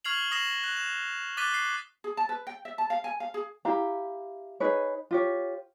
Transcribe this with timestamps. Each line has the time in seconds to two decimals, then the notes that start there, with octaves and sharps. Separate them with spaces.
0.05 C#6 F6 G#6 C7 F7 F#7
0.31 C#6 D#6 A#6 C7 E7 F#7
0.64 F#6
0.77 E7
1.37 D6 F#6 A6 B6 D#7 G7
1.54 C7
2.04 G#4
2.17 A5
2.29 B4
2.47 G5
2.65 E5
2.78 A5
2.90 F5
3.04 G#5
3.20 F5
3.34 G#4
3.65 E4 G4 F5 A#5
4.60 D#4 G#4 B4 C#5
5.11 F4 G4 C#5